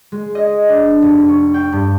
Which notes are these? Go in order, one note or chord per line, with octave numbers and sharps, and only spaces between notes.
G#3
D#5
D4
F1
C#6
G5
G2